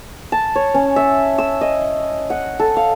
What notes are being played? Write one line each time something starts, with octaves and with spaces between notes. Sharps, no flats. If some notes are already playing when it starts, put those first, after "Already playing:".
A5
C#5
C#4
E5
E6
D#5
F#5
A4
F5